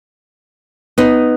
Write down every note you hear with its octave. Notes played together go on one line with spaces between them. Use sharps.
B3 D#4